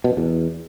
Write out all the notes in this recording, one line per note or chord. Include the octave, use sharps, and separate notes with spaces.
B2
F#2
E2